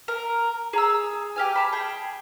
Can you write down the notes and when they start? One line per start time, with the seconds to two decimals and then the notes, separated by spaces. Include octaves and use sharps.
0.08 A#4
0.73 G#4 A#5 E6
1.36 G4 F5 G#5
1.56 A5 B5
1.72 G#4 G5